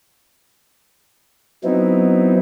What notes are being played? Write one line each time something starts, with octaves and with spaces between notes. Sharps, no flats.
F#3 B3 C4 D#4 E4